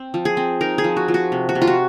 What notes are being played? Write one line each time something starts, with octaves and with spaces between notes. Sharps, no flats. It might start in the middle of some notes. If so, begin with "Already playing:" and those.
Already playing: C4
F3
G#4
C4
D#4 A#4
G#4
F3
F#4
F3
F#4
C3
F#4
C3
F4
F#4